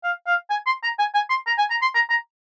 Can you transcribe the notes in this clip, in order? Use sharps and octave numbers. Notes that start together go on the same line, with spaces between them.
F5
F5
G#5
C6
A#5
G#5
G#5
C6
A#5
G#5
A#5
C6
A#5
A#5